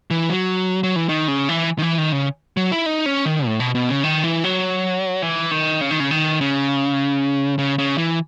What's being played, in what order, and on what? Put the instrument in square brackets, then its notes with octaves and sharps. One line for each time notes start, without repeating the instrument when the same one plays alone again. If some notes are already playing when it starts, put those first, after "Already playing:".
[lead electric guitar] E3
F#3
F#3
E3
D#3
C#3
E3
D#3
E3
D#3
C#3
F#3
E4
D#4
C#4
D#3
A2
B2
B2
C#3
D#3
E3
F#3
E3
D#3
C#3
D#3
C#3
D#3
C#3
C#3
C#3
E3